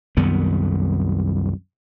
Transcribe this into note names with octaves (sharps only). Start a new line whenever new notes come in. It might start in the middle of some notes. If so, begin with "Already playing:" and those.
C2 F#2 D#3 B3